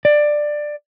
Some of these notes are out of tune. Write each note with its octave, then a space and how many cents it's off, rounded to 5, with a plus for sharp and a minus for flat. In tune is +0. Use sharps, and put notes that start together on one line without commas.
D5 +15